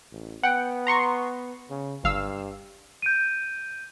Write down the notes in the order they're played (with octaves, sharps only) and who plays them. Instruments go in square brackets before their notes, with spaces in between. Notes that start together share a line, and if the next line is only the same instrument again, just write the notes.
[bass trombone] A1
[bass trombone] B3 [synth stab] F#5 G5
[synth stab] A#5 C6 C#6
[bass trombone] C#3
[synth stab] G1 F5 E6 [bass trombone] G2
[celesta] G6 D7 D#7